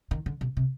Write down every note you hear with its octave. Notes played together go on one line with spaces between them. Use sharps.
D#3
D3
B2
C3